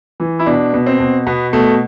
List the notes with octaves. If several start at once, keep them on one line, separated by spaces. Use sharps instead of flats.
E3
E4
B2 D4
B2
C4
B2
B2 B3
B2 A3